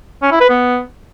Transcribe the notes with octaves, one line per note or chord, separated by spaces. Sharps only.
C#4
E4
B4
B3